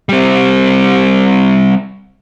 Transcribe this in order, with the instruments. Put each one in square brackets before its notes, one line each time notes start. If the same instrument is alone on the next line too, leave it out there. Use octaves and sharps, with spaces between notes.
[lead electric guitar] G3 C4